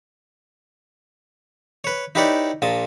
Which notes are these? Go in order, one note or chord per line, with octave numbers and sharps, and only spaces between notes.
B4 C#5
D#4 E4 G4 B4 C#5 D5
A#1 A#2 A5 D#6